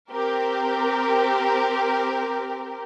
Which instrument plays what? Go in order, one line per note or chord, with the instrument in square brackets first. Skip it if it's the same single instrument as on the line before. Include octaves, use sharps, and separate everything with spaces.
[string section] C4 G4 A#4